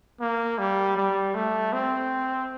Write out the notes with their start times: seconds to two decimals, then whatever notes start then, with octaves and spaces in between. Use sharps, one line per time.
0.20 A#3
0.59 G3
0.97 G3
1.35 A3
1.73 C4